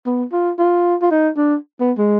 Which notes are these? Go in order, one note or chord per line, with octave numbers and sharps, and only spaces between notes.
B3
F4
F4
F4
D#4
D4
B3
G#3